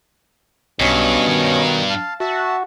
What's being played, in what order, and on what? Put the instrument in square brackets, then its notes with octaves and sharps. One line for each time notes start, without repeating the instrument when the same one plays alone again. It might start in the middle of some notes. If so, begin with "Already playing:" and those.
[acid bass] B1 [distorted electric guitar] G2 [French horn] B2 [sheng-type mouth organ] C#4 C#5 D#5
[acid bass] D#3
[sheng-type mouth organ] F5 A5
[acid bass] F#4 [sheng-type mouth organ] E5 A5